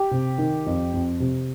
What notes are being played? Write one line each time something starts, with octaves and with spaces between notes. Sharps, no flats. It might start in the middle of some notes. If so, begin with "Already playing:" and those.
Already playing: G4
C3
D#3
F2
F2
C3